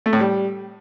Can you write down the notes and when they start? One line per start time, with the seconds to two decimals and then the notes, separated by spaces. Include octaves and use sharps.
0.06 A3
0.13 A2
0.20 G3